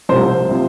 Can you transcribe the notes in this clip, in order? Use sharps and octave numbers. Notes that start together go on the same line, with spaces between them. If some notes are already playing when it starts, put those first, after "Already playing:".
C2 C3 F3 C5
C3 F3